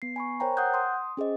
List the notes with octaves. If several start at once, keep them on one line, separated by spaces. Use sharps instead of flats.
B3 C7
G#5 B5 C#6
A#4 C5 C#5 G5 A#5
F#5 D#6 F#6 G6
C6 D#6
C#4 G#4 C5 D#5